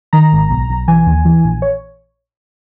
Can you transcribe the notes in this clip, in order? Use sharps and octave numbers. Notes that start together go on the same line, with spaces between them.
D#3 A#5
G#1
B1
B1
E3 G#5
D#2
E3
A#1
C#5